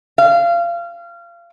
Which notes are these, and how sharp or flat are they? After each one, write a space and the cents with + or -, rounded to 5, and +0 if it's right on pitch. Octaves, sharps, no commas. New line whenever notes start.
F5 -25